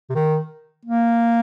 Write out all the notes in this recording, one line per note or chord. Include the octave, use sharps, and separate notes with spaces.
C3
D#3
A#3